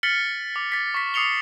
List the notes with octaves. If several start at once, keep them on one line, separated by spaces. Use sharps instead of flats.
F6 A6 B6 C#7 F#7 G7
D6
A6 B6
C#6 B6
D6 D#6 C7 C#7 F7 G7